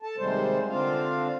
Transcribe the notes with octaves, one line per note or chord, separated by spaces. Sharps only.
A4 A5
D#2 C3 G3 G#3 C5
D3 C4 D4 F4 F5